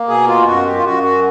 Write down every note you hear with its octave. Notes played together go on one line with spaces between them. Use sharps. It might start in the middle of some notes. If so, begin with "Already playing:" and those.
Already playing: A#3
B2 G#4
F4
F#2 F#4
G4
F4
F#2 F#4
F#4